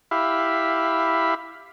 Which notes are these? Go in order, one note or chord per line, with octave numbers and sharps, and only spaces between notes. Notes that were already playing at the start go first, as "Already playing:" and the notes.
E4 G4 E5 F5 B5